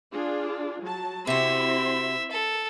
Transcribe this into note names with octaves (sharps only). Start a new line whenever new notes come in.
D4 F4 G#4
F#3 A5
C3 C4 E4 F#4 E5 C6
A4